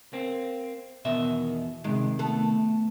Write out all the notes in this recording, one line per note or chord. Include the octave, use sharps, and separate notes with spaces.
A#3 C4
E2 B2 D#3 E5
C3 D#3 G#3
A3 B3 A4